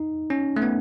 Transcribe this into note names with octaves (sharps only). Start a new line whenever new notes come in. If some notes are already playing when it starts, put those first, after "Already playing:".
Already playing: D#4
C#4
A3
B3